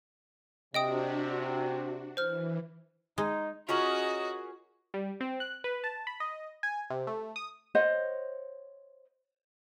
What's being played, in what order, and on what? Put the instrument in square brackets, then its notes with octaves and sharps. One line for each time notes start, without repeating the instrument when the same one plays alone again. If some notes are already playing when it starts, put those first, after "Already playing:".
[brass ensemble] C3 [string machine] D4 F#4 [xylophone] D#5 G5 D#6
[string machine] E3 [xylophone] C5 F6
[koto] G#3 [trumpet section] D#4
[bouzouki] C#4 G#4 A#4 [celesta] F4 C#6 F#7 [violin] F#4 [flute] D#5
[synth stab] G3
C4
F#6
B4
A5
B5
D#5
G#5
C3
A3
D#6
[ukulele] C5 C#5 D#5 F#5